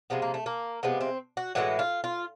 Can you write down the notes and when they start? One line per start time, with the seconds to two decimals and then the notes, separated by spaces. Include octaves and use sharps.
0.10 C3 F3 G#3 B3
0.22 A#3
0.34 A3
0.46 A#3
0.83 C3 F3 G#3 B3
1.01 C4
1.37 F#4
1.55 A2 E3 G#3 F#4
1.79 F4
2.04 F4